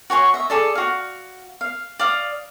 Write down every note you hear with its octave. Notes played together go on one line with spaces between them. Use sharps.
F#4 C#5 G#5 C6
D#5 E5
G#4 A4 D5
F#4 F5
F5
D5 F5 D#6